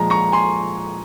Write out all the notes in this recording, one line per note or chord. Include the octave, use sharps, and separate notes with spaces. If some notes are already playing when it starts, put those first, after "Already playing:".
Already playing: A#2 F3 G#3 A#5
A#5 C#6
G#5 C6